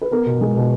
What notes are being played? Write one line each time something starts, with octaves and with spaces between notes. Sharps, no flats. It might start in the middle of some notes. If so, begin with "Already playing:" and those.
B4
B3 A#4
B2
G#3
B2